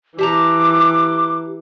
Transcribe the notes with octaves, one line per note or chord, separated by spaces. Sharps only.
E3 G4 A5 A#5 D6